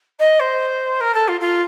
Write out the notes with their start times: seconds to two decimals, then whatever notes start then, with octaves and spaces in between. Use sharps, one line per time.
0.19 D#5
0.39 C5
1.00 A#4
1.14 A4
1.28 F4
1.40 F4